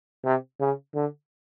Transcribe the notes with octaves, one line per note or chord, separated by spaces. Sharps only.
C3
C#3
D3